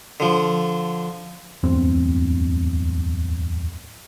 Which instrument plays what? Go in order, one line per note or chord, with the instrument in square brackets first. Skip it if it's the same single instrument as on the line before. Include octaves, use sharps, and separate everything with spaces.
[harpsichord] D3 F3
[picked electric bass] D1 E2 G2 C4